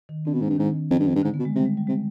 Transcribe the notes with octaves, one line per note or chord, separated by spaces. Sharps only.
D#3
D3 C4
B2
G#2 D4
G2
G#2 D#3
F2
G2
F2
G2
G#2 D3
B3
B2
G#3
C3 G3
G#3
G3
C3 G#3